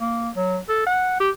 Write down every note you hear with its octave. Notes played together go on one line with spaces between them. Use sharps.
A#3
F#3
A4
F#5
G4